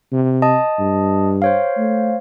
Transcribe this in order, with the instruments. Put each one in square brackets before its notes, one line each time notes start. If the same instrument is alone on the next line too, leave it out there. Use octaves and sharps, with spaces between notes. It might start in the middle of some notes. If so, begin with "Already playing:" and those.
[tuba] C3
[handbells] D#5 A5 D#6
[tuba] G2
[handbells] C5 C#5 F5
[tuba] A3